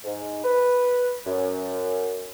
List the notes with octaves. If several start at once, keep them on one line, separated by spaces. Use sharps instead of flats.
G#2
B4
F#2